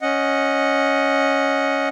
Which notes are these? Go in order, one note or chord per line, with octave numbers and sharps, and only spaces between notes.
C#4 D#5 F#5